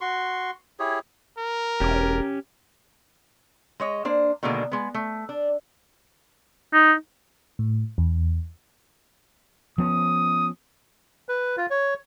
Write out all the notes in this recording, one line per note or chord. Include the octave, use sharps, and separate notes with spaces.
F#4 C6 C#6
E4 G4 G#4 C#5
A#4
E1 C#4 G4
G#3 C#5 D#5
A#3 D4 C5
B2 D3 D#3 G#3 A#3 D4
G#3 B3
A3
D4
D#4
A2
E2
F3 B3 C#4 D#6
B4
F4
C#5